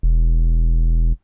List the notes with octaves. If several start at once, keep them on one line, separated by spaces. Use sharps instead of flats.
E1